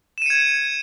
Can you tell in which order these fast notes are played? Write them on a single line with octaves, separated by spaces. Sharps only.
E7 D#7 C#7 G#6